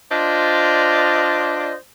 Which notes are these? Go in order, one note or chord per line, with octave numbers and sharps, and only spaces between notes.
D4 F4 C5 D5 D#5